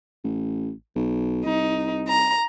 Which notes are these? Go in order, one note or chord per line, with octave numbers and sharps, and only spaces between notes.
A1
B1
C2 D#4
A#5